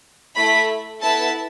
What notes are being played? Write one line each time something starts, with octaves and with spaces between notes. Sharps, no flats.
A3 E4 A4 B5
B3 E4 A4 A5